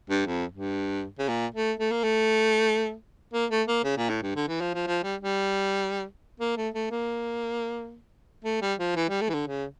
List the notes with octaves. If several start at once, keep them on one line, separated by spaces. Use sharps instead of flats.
G2
F2
G2
C#3
A#2
A3
A3
A#3
A3
A#3
A3
A#3
C#3
A#2
A2
G2
D3
E3
F3
F3
F3
G3
G3
A#3
A3
A3
A#3
A3
G3
F3
E3
G3
A3
E3
D3
C#3